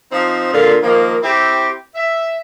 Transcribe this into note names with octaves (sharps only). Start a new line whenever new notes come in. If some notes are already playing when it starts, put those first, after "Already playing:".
F3 C4 D#4
A#2 D3 F4
D#3 F3 A#3
C4 E4 G4
E5